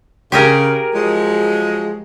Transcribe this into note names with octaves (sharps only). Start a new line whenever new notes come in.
C#3 G4 G#4 A#4
F3 F#3 G#3